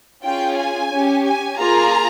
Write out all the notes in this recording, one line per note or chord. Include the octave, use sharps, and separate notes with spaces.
C#4 F4 G#4 G5
G#5
C#4 G4
G#5
A#3 F4 G#4 A#5